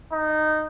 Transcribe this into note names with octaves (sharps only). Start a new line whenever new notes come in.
D#4